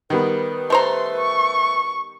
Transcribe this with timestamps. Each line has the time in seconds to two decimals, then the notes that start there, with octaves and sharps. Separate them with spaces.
0.10 D#3 G3 B3 B4
0.70 A3 C5 A#5 C6
1.17 C#6